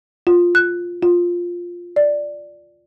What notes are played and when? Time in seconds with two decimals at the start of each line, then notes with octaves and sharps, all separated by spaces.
0.27 F4
0.55 F#6
1.03 F4
1.96 D5